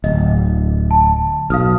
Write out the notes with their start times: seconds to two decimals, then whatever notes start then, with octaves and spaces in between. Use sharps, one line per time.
0.04 D1 D#5
0.91 A5
1.50 B1 F5 D#6 F6